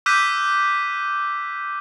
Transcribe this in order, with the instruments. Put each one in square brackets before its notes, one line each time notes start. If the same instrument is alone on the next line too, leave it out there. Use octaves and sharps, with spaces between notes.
[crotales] D6 E6 F#6 G6 B6 D#7